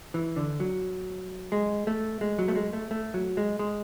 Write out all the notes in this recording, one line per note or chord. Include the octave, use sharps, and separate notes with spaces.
E3
D3
F#3
G#3
A3
G#3
F#3
A3
G#3
A3
A3
F#3
G#3
G#3